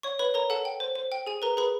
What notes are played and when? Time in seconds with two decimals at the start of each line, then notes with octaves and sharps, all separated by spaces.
0.03 C#5 C#6
0.19 B4 C#5 B5
0.34 A#4 C#5 A#5
0.50 A4 F#5 A5
0.65 G5
0.80 C5
0.95 C5
1.12 G5
1.26 G#4 G#5
1.42 A#4 B4 A#5
1.57 G#4 B4 B5